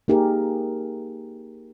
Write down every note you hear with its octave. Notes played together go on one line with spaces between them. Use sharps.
A#3 D#4 G4 G#4 A#4